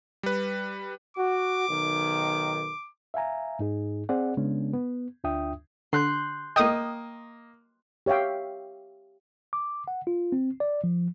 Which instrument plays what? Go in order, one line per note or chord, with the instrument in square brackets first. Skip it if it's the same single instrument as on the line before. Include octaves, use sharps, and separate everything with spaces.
[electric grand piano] G3 B4
[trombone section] F#4 [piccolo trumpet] D6
[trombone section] B1 D#3
[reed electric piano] E5 F5 G#5 A#5
G#2 D#4 G#4
C4 G#4 D5 F#5
C#3 G#3 B3 C#4 D4
B3
D2 D4 F4 E5 G5 D#6
[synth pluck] D3 [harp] C6 F#6 G6
[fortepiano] A#3 D#5 [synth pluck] G5 D#6
[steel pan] G4 C#5 E5 F5 G5
[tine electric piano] D6
F#5
F4
C4
D5
F3